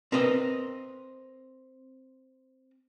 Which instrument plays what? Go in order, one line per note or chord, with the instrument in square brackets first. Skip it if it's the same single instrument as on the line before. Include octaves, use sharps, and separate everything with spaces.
[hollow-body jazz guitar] C4 A#4 B4 D#5